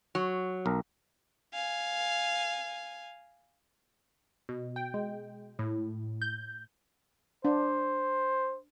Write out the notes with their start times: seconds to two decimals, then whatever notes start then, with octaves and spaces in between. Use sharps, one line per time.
0.15 F#3
0.66 B1 A#4
1.53 F5 G#5
4.49 B2
4.76 G5
4.94 G#3
5.59 A2
6.22 G6
7.45 D4 C5